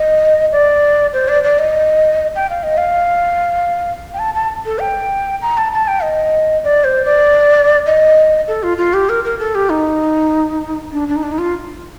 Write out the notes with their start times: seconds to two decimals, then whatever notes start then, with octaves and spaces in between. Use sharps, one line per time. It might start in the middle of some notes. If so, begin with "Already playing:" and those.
Already playing: D#5
0.52 D5
1.13 C5
1.28 D5
1.44 D5
1.59 D#5
2.36 G5
2.50 F5
2.63 D#5
2.77 F5
4.14 G5
4.19 A5
4.35 A5
4.65 A4
4.81 G5
5.42 A#5
5.57 A5
5.73 A5
5.88 G5
6.03 D#5
6.64 D5
6.84 C5
7.05 D5
7.86 D#5
8.48 A4
8.63 F4
8.78 F4
8.94 G4
9.09 A#4
9.24 A#4
9.39 A4
9.55 G4
9.70 D#4
10.92 D4
11.08 D4
11.16 D#4
11.23 D4
11.32 D#4
11.38 F4